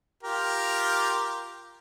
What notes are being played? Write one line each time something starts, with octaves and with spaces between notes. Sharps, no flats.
F4 G4 A#4